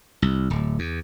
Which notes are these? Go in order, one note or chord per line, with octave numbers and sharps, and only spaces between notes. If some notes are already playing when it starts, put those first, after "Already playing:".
C2
D1
E2